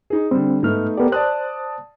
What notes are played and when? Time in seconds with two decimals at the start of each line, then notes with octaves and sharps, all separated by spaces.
0.10 D#4 G#4
0.31 D3 G3 C4
0.63 G#2 A3 B3 D#4 F6
0.97 B3 G4 A4 A#4 D5
1.12 C5 D5 A5 D#6 F#6